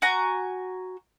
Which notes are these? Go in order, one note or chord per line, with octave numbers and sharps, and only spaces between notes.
F#4 G#5 A#5